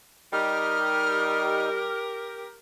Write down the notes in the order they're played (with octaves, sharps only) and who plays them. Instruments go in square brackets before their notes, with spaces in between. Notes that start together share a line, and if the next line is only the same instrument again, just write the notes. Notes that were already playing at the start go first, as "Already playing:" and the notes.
[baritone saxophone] G3 [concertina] D#4 D#5 [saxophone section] G4 A#4 [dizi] F6